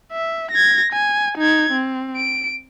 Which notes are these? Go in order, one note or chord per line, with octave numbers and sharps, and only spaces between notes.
E5
G#6 A#6
G#5
D#4 G#6
C4
D7